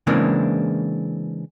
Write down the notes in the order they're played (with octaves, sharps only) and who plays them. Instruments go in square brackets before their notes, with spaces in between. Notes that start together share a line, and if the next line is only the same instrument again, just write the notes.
[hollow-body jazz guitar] C#3 E3 G#3 A#3 C4 D4